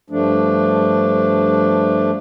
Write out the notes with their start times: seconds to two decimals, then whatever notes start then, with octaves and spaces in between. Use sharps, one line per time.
0.10 G2 F3 A3 D4